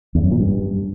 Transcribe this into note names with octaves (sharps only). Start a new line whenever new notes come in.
E2
F#2
A#2
G2